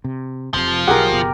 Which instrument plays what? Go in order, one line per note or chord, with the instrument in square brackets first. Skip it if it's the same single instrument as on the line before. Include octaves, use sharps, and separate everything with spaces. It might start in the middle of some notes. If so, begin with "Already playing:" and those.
[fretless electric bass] C3
[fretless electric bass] F1 C3 [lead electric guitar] F3
[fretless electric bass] B1 [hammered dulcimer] G4 A#4 [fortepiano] G#4 F#5
[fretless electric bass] F#1 B2